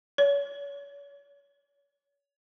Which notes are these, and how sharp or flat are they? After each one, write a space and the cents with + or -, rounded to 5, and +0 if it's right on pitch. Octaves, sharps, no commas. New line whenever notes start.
C#5 +35